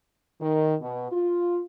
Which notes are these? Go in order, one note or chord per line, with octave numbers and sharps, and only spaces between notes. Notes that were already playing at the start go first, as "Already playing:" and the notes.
D#3
B2
F4